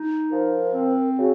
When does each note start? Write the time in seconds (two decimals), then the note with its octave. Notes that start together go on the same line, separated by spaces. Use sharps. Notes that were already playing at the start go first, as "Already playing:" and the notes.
Already playing: D#4
0.31 F3 A#4
0.73 C4
1.18 C#3 F#4